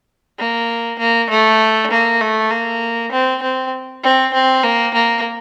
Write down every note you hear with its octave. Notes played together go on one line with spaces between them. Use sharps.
A#3
A#3
A3
A#3
A3
A#3
C4
C4
C4
C4
A#3
A#3